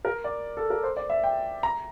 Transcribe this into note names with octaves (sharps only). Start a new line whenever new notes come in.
A#4
D5
A4
A#4
C5
D5
E5
G5
A#5